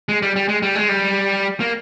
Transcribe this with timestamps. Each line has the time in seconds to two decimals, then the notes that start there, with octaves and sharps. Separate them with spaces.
0.09 G#3
0.22 G3
0.36 G3
0.48 G#3
0.62 G3
0.75 G#3
0.89 G3
1.60 A#3